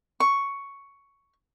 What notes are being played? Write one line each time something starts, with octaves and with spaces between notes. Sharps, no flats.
C#6